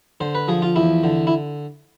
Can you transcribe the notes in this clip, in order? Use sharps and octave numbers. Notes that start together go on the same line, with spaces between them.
D3 C5
B4
F3 G#4
F4
E2 E4
D3
E4